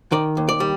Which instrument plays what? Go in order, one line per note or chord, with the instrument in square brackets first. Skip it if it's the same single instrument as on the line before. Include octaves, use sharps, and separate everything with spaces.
[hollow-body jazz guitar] D#3 D5
D#2
D5
G3